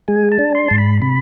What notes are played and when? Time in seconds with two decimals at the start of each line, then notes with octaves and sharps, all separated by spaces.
0.08 G#3 G#5
0.32 A5
0.39 D4
0.55 C6
0.68 G#2 A5
0.78 B5
1.02 C3 B5